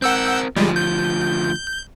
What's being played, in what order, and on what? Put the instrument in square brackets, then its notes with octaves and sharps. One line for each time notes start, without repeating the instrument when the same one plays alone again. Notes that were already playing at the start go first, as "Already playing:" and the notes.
[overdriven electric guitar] C4 A#4 [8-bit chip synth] F#5 E6 G6
[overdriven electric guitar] D2 F3 [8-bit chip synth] G3 G#3
[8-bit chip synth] G6